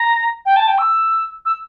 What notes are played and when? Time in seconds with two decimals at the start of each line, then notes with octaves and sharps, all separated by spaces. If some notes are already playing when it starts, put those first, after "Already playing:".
Already playing: A#5
0.45 G5
0.56 A5
0.67 G5
0.78 E6
1.45 E6